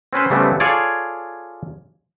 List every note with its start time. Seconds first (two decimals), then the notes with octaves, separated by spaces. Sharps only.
0.13 C4 C#4 B4 C5
0.30 C#3 G3 A3 B3 C4
0.60 F4 G#4 A4 C#5 D5